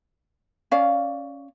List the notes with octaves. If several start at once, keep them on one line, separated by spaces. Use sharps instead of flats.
C#4 D5 F5